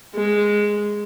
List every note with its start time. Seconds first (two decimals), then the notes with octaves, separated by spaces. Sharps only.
0.15 G#3